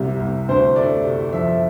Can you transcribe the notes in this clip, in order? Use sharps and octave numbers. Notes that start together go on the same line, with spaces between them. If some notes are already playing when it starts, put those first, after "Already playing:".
Already playing: C2 C3 G3
C2
D2 C5
A3 D5
C3
F3 E5